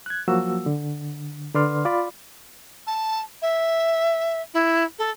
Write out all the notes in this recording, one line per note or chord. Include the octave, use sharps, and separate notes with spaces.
F#6 G#6
F3 F#3 A#3 F#4 E6
D3
D3 B4 D5 C6 F6
F4 D5 B5
A5
E5
E4
A4